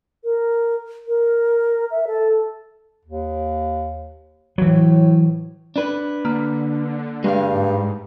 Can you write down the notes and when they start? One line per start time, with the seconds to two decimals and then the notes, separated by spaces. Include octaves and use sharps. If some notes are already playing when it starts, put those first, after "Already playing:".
0.24 A#4
1.07 A#4
1.91 E5
2.07 A4
3.05 D#2
4.58 A2 E3 F#3
5.76 D4 B4
6.25 D3 A#3
7.24 G2 G#3 F5
7.53 G#2